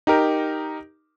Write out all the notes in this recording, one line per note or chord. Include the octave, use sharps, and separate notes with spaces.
D#4 G4 A#4